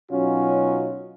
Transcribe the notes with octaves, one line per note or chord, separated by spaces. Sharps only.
B2 F#3 C#4 D#4 F4 F#4